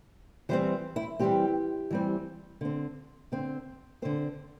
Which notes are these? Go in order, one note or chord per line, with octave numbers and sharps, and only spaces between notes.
E3 G3 C4 C5
E4
E3 G3 C4 G4
E3 G3 C4
D3 C4
D3 C4
D3 C4 C5